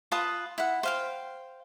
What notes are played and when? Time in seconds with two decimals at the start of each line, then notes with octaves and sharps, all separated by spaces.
0.12 F4 B4 A5 D#6
0.58 E4 F#5
0.83 C5 F5 G5